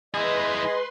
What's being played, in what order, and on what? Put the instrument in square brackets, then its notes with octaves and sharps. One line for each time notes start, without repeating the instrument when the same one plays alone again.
[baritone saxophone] G#3 [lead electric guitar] E4 G#4 [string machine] B4 C6 [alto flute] D#5